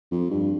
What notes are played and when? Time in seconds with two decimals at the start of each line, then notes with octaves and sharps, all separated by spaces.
0.11 F2
0.30 G2